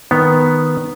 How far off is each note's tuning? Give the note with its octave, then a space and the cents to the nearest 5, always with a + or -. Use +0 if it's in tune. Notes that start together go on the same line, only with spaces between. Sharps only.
D#3 +0 B3 +0